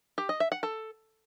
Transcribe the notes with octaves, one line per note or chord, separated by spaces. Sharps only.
G4
D#5
E5
F#5
A4